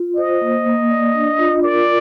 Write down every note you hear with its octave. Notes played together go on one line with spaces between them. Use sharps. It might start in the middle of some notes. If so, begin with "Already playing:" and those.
Already playing: F4
C5 D#5
A#3
A#3
D5
D4
F4
A#4 D5